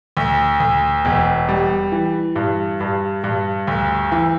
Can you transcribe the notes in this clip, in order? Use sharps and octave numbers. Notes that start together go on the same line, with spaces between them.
D2
D2
E1
G3
E3
G2
G2
G2
D2
E3